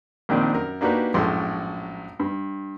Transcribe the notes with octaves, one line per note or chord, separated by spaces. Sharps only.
A#1 A#2 D#3 C4 D4
F#2 A#4
A#3 D4 D#4 F#4 G4 B4
A#1 F#2 A2 G#3 A4 C6
G2